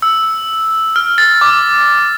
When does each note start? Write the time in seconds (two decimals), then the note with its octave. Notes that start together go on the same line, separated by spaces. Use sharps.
0.02 E6
0.96 F6
1.18 A6
1.41 D6